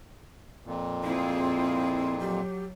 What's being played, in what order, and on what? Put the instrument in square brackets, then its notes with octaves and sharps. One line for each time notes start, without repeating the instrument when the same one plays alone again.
[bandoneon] F2 A#2
[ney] C4 [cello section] E4 F4 G#4
[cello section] F#3 [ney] G4